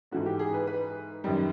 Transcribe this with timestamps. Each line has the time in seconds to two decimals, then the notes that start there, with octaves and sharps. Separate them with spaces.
0.11 G#2 E3 A3 F#4
0.26 G4
0.39 G#4
0.54 B4
0.67 B4
1.24 F#2 D#3 G3